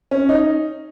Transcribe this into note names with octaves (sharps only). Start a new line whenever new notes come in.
C#4
D#4